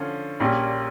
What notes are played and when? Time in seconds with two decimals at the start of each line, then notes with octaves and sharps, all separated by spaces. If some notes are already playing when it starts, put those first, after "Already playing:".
Already playing: D3 F3 C#4
0.40 A#1 A#2 G3 C#4 G4